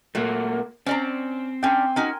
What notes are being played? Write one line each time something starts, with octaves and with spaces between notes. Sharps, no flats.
A#2 F#3 A3 A#3
C4 C#4 D5 A#5
C#4 D4 G5 G#5 C6
C#4 D#4 F#4 A#4